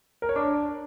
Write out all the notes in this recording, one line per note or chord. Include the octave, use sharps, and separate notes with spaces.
A#4
C#5
D4